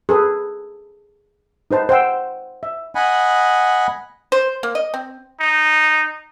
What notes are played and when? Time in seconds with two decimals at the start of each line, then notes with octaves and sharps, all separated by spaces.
0.09 G#4 A4 B4 D#6
1.71 D#4 B4 C5 A5
1.89 C5 F#5 G5 E6
2.63 E5
2.95 D#5 F#5 G#5 B5
4.32 C5
4.63 A#3
4.75 D#5
4.94 C4
5.40 D#4